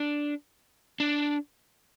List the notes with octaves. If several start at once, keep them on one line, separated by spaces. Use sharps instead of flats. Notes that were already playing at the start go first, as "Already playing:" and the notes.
Already playing: D4
D4